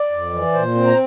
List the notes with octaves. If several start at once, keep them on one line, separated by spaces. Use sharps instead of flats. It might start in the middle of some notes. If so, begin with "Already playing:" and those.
Already playing: D5
F2
E3
A#2 C5
C4
A#5